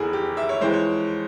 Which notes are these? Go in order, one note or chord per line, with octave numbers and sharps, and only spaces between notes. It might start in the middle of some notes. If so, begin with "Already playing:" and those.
Already playing: F1 E2 E3 G#4
G4
E5
C#5
F2 E3 G#3 C5
C#5